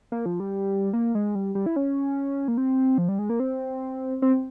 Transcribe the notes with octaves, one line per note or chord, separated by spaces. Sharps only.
A#3
F3
G3
A#3
G#3
G3
G3
E4
C#4
A#3
C4
F3
G3
G#3
A#3
C4
C4